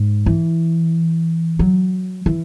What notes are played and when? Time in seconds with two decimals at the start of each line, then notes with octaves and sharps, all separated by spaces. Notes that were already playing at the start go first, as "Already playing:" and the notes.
Already playing: G#2
0.26 E3
1.59 F#3
2.26 E3